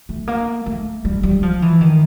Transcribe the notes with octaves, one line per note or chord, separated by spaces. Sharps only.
A3
A#3
A3
G3
G3
F3
E3
D#3